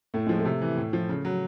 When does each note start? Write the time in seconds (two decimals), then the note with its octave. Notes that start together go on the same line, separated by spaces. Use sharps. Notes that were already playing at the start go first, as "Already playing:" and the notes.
0.14 A2 A3
0.27 F3 G#3
0.39 A3
0.45 C3
0.62 E3
0.77 A2
0.93 F3
1.09 C#3
1.25 F#3